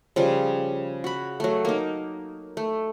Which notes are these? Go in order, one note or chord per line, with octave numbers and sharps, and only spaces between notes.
C#3 F3 G3
F#4 B5
F#3 A3
A#3 D#4
A3